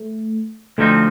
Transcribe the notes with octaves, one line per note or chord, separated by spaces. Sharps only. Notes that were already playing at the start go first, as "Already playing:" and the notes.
Already playing: A3
D2 D3 F3 A3 C4 D#4